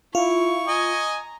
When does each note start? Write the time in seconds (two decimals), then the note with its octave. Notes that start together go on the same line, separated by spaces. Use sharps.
0.15 E4 F4 C#6
0.67 D#5 G#5 A#5